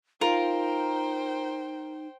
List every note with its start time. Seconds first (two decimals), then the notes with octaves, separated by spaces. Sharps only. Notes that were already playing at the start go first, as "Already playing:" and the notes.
0.21 D#4 F4 A#4 C5 G5